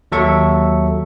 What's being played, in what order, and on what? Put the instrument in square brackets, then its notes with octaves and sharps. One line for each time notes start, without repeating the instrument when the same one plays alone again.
[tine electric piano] D#2 F#3 A4 E5 C#6